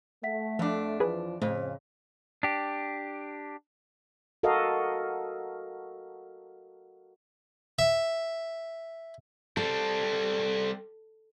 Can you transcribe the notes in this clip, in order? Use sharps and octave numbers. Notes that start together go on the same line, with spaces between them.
A3 E5 F#5 B6
F2 F3 D4
E3 F3 G#4 B4
F2 A2 C#3 C5
D4 G4
F#4 A4 A#4 D#5 F5
E5
G3 C4 A4